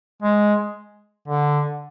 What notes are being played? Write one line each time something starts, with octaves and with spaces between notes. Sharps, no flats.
G#3
D3